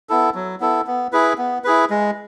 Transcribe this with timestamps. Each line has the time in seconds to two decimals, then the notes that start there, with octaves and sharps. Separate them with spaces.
0.09 B3 E4 A4
0.35 F#3
0.60 B3 E4 A4
0.87 B3
1.12 E4 G#4 B4
1.38 B3
1.64 E4 G#4 B4
1.90 G#3